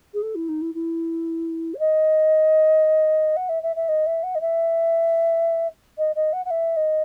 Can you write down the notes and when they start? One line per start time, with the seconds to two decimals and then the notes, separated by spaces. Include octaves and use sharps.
0.14 G#4
0.22 A4
0.35 E4
0.48 D#4
0.61 E4
0.74 E4
1.74 C#5
1.79 D#5
3.36 F#5
3.49 E5
3.63 E5
3.76 E5
3.88 D#5
4.06 E5
4.23 F#5
4.35 D#5
4.41 E5
5.98 D#5
6.15 D#5
6.33 F#5
6.45 F#5
6.50 E5
6.76 D#5